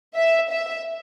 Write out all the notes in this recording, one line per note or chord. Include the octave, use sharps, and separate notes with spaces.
E5
E5